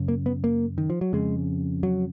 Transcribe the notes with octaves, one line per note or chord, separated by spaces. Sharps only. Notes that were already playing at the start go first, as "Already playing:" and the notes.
Already playing: F#2 C#3
A#3
B3
A#3
D#3
F3
F#3
F2 C#3 G#3
F#3